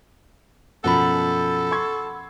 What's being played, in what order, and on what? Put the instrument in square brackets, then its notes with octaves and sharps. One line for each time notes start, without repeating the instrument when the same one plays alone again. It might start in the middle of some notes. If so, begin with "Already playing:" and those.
[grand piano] F#2 B2 F3 [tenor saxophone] A4 [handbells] F#5 B5
[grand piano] C6 C#6 G#6